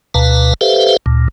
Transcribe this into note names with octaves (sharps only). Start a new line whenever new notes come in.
D2 B2 B4 F5 A5 A#5
G4 A4 B4 C5 E5 F5
D2 A#2